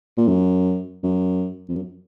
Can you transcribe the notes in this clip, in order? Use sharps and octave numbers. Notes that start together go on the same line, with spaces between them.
A#2
F#2
F#2
F2
F#2